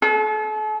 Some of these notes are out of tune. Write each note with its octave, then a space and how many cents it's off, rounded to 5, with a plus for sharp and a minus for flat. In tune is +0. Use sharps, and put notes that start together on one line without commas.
A4 -40